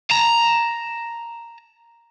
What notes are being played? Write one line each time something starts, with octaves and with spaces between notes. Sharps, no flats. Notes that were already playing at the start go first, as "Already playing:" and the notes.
A5 A#5